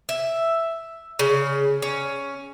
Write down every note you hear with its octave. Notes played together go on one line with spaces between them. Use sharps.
E5
C#3
C#4